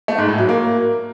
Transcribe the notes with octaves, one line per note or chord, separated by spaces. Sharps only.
A3
G#2
A2
F#3
A#3